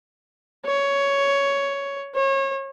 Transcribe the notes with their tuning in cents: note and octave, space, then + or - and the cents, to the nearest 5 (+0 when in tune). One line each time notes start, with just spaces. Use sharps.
C#5 +10
C#5 -30